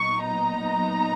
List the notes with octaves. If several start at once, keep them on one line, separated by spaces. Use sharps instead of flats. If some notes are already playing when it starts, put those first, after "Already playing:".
Already playing: A#2 F#3 B3 D#4 C#6
A#5